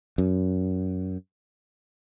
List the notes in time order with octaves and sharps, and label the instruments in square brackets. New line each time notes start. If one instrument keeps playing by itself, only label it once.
[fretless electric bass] F#2